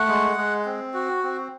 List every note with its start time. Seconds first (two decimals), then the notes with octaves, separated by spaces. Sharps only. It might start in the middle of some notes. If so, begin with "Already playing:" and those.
Already playing: A3 F#5
0.08 G#3
0.37 G#3
0.66 C4
0.94 F#4
1.23 C4